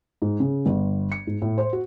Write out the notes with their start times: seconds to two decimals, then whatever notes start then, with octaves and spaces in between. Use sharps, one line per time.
0.22 G#2
0.40 C#3
0.66 G1
1.12 C#7
1.27 G#2
1.42 A2
1.58 C5
1.73 F#4